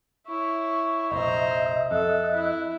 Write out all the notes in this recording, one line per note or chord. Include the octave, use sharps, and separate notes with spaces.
E4 C#5 C#6
F1 A#1 C5 D#5 E5 A#5
F2 A4 F#6
E4